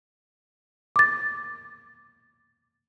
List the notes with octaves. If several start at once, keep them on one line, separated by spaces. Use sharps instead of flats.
D6 A6